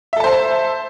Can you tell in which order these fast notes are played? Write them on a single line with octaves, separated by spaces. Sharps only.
E5 A4 A5 C5